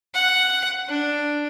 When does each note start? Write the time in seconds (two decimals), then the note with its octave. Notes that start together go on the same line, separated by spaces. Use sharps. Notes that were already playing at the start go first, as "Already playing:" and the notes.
0.14 F#5
0.89 D4